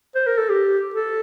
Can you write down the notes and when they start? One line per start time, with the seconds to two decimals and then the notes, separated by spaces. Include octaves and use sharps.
0.15 C5
0.27 A#4
0.38 A4
0.49 G4
0.94 A4